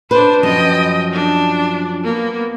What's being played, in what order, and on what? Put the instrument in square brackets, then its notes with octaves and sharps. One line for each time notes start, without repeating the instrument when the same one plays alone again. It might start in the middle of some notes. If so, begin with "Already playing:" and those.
[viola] D4 C5 [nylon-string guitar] B4
[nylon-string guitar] F#2 F3 [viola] D#5 G5
[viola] D4
A#3 B3